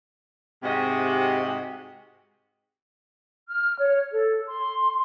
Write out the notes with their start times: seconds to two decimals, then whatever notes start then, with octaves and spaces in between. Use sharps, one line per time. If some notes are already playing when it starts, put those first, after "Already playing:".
0.63 G#2 C3 F#4 G4 D#5
3.48 F6
3.80 C#5
4.12 A4
4.48 C6